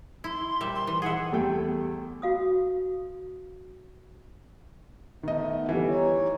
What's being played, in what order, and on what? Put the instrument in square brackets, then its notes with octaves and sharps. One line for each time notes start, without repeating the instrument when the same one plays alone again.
[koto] E4 [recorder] C6
[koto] A#2 G3 E5
[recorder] C6
[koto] E3
[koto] G#4 E5 [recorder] F#5
[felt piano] E2 G3 A3 G5
[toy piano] F#4 F5 D#6
[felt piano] D#3 D#5 [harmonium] A3 B3
[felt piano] E3 G3
[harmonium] D#4 C#5